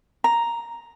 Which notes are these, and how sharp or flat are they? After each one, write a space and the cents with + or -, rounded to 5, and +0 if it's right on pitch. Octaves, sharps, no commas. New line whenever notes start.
A#5 +0